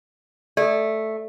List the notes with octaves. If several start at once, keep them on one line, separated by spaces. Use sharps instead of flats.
A3 A4 D5